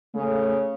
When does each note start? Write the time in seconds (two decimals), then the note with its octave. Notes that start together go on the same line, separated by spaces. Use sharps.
0.14 C#3 A3